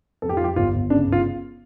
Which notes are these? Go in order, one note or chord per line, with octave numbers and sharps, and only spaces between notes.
F2 A4
G4
F2 F4
G4
G1 F4
G1
C#3 D4
G1
F4